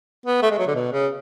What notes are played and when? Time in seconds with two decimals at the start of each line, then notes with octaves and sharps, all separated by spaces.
0.26 B3
0.42 A3
0.51 G#3
0.59 F#3
0.67 D3
0.75 B2
0.92 C#3